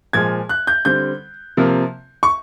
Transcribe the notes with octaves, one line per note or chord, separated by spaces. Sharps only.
A#2 F3 G#3 G#6
F#6
G6
D3 G3 C4 G6
C3 F3 A#3
C#6